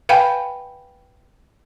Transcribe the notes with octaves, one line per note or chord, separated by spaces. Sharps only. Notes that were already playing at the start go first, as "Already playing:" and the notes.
B4 F5 G5 G#5 B5